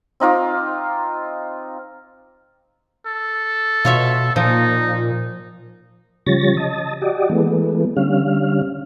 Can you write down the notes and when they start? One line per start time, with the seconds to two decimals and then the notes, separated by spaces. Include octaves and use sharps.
0.20 C4 D#4 F4 D6
3.06 A4
3.85 B2 F4 C#5 E5
4.36 A#2 F3 D#4
6.26 C#3 F3 G3 C#5 A6 A#6
6.57 D#5 A5
7.02 F#4 G4 D5 D#5
7.30 E3 G#3 A3 B3
7.97 D3 G3 C#4 F5